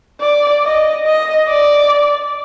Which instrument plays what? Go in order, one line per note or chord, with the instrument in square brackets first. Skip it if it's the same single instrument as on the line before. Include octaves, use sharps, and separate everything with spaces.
[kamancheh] D5
D#5
D#5
D5